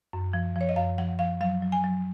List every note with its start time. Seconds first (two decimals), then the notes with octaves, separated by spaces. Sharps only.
0.13 F#2
0.33 F3
0.56 F3
0.61 C#5
0.69 D#5
0.76 F#2 F5
0.98 F3 F#5
1.19 F3 F5
1.41 F#3 F5
1.62 F#3
1.72 G#5
1.84 F#3